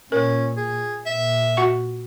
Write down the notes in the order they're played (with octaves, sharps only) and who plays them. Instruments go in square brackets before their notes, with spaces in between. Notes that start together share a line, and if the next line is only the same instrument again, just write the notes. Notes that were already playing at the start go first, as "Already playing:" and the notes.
[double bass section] A#2 [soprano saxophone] C#4 [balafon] A#4
[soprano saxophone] G#4
[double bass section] A#2 [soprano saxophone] E5
[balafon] F#4 F#5 C#6